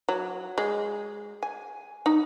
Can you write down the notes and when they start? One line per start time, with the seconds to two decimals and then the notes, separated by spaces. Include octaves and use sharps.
0.09 F#3
0.58 G#3
1.43 G#5
2.06 D#4